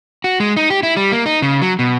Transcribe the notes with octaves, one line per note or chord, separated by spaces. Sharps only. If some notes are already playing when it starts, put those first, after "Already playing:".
F#4
G#3
D#4
G4
E4
G3
A#3
D#4
C#3
F#3
B2